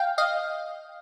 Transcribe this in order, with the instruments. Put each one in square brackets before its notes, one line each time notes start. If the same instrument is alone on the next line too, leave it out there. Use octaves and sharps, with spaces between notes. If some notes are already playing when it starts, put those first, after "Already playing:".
Already playing: [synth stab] F5 G5
D#5 F5